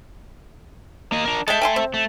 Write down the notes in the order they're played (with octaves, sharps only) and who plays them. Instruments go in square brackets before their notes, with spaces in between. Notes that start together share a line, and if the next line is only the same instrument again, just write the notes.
[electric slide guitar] A#3 D#5
D4 A#4
[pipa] G#3 G5 [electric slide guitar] A4 E5
[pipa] G5 G#5 C6
C4
[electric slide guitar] A3